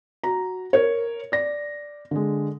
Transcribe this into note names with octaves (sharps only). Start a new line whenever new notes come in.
F#4 A#5
A#4 C#5
D5 A#6
D3 G#3